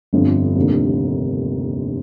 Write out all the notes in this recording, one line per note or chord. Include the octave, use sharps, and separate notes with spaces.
G1 F2 D3
F1 D#2 D3